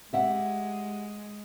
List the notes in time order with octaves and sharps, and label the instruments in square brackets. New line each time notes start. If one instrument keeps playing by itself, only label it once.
[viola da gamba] G#3 [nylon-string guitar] G4 E5 F#5